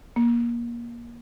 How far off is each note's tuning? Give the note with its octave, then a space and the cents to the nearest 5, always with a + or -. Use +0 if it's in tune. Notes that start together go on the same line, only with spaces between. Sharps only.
A#3 +25